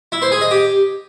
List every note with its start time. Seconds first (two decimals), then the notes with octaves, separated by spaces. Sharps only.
0.12 E4
0.22 C5
0.32 G#4
0.41 D#5
0.51 G4